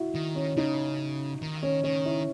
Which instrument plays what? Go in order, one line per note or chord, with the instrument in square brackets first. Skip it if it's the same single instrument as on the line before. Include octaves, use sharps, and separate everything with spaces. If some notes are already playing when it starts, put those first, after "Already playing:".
Already playing: [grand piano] E4 F#4
[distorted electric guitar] D#3
[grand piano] C#4
[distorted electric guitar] C#3 [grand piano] D#4
[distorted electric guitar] D#3
[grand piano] C#4
[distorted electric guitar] D#3 [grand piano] C#4
[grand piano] E4